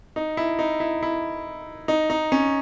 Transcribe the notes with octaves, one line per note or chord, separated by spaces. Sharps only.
D#4
E4
D#4
E4
E4
D#4
D#4
C#4